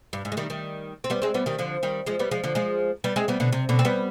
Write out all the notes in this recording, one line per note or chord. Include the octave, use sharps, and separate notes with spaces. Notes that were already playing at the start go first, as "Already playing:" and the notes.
G2
G#2
G#3
D#3 G3
D#3 G3
C4
G3 B3
G#3 C4
G3 B3
D#3 G3
D3 F3
D#3 G3
F3 G#3
G3 B3
F3 G#3
D3 F3
F3 G#3
G3 B3
G#3 C4
G3 B3
B2 D3
C3
B2 D3
C4
G3 B3